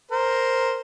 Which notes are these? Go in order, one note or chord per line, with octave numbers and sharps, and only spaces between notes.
A#4 C5